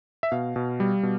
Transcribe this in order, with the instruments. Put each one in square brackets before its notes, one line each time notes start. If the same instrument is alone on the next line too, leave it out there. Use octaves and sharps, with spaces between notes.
[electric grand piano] E5
B2 F5
B2
G3
B2